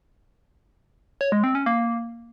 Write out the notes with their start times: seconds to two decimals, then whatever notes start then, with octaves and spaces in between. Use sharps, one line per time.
1.21 C#5
1.32 G#3
1.44 C4
1.55 C#4
1.66 A#3